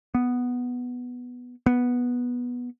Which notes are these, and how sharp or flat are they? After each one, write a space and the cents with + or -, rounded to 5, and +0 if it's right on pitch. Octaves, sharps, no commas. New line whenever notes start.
B3 +0
B3 -10